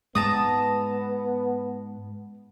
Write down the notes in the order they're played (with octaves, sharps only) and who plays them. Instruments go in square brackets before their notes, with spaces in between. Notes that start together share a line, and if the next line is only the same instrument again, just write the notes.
[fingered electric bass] G#2 G#3 [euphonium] B3 [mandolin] A5 A#5 D#6